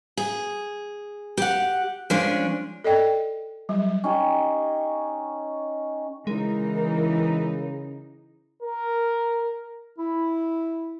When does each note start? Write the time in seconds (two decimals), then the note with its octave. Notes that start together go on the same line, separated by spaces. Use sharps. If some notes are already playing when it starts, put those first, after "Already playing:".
0.17 G#4
1.37 G4 F#5
2.10 F3 G#3 C#4 D4
2.84 A4 D5 D#5 G5
3.69 F#3 G3
4.04 C#4 D#4 G4
6.27 C#3 E3 G#3 D#4 A#4
8.62 A#4
9.98 E4